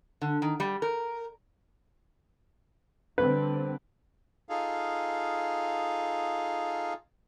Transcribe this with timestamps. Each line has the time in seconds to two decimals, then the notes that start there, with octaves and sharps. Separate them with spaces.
0.22 D3
0.42 D#3
0.60 G3
0.82 A#4
3.18 D3 G3 C4 B4
4.49 D#4 F4 G#4 A4 F5